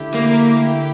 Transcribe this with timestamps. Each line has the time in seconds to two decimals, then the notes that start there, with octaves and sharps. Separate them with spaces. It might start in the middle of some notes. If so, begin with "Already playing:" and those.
Already playing: D3 A3 E4 G4
0.14 A#3